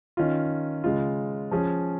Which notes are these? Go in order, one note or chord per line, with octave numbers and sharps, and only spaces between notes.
D#3 C#4 F4
C#3 G#3 F4
F3 C#4 G#4